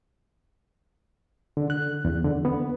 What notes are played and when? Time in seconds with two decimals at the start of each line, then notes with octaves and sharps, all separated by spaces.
1.57 D3
1.70 F#6
2.05 E2
2.25 D3
2.45 B3